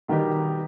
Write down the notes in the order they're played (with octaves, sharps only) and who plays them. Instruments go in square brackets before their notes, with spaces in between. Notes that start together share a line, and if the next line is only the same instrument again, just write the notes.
[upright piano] B2 G3 B3 D#4 G4 [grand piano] D#3